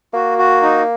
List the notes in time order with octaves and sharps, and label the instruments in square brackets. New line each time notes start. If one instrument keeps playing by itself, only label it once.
[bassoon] A#3 [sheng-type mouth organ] F#4
[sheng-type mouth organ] F#4
D#4